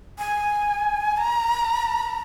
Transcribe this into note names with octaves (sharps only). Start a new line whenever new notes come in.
G#5
A#5